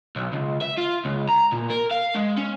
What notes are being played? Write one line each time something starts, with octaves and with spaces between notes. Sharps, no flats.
B1
C#2
E5
F4
C#2
A#5
A#2
A#4
F5
G#3
C#4